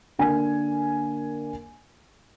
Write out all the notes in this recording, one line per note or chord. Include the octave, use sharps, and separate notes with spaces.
D3 A#3 G#5